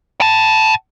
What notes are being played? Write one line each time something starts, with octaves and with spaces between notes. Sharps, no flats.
G5 A5